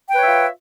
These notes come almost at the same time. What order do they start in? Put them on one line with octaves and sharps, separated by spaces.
G5 B4 C#5 E5 F4